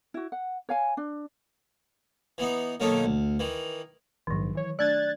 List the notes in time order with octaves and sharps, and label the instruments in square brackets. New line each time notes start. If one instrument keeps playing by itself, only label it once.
[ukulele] E4 F#4
F#5
C#5 F5 G#5
D4
[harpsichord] E3 B3 D#4
B1 D#3 A#3 C#4 D#4 A4
D2
D#3 E3
[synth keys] A#1 G#2 [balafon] D#3 F#3
[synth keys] E3 C#5
[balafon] A3 D4 [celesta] D5 [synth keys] F#6 G#6 A6